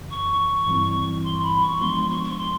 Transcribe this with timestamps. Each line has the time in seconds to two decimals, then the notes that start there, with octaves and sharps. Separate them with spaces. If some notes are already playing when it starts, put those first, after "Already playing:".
Already playing: F#2 C#3 E3
0.10 C#6
0.66 G2 E3 G3 C4 E4
1.24 C6
1.42 B5
1.61 C#6
1.80 F3 G#3 B3 D4 C6
1.95 C6
2.09 C#6
2.24 C#6
2.38 C6